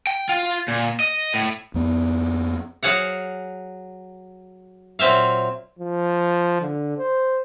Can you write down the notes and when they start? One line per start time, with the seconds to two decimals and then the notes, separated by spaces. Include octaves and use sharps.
0.07 G5
0.29 F4
0.68 A#2
1.00 D#5
1.34 A2
1.74 F2 B3
2.83 F#3 G#4 F5 F#5
4.99 A#2 F#3 C4 E5 F5
5.79 F3
6.62 D3
6.98 C5